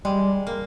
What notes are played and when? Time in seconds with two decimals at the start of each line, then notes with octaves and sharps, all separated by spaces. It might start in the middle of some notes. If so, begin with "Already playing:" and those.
0.05 G3 G#3
0.47 A#3